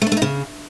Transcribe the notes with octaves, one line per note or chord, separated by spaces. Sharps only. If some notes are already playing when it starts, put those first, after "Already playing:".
A3
D4
A3
D#4
C#3